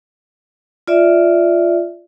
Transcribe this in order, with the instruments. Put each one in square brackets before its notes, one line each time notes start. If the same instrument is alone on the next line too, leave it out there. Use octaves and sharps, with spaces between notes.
[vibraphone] F4 D5 E5